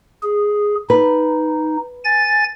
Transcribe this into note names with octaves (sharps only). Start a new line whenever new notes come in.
G#4
D#4 B4
G#5 A6